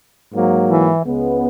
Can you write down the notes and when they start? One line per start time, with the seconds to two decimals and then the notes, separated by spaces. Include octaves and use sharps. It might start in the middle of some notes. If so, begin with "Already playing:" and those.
0.34 G#2 F#3 A#3
0.70 E3 E4
1.05 C#2 C#3 G#3 B3